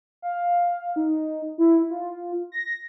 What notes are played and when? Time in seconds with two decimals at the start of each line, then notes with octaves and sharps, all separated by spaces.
0.22 F5
0.96 D#4
1.58 E4
1.90 F4
2.52 A#6